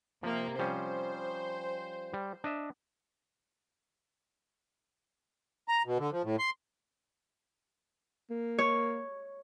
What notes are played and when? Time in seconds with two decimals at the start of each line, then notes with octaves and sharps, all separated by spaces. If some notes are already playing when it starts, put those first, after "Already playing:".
0.23 C3 F3 A#3
0.59 F3 G3 C#4 C5
2.14 G3
2.44 D4 D#5 E5
5.68 A#5
5.86 B2
5.98 D3
6.12 F3
6.24 A2
6.39 C6
8.30 A#3
8.58 C#5